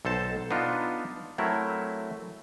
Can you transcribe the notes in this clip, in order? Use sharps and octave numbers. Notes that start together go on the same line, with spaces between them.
B1 A4 C5 A5
B3 D4 D#4 F4
F#3 A3 C4 E4 A#4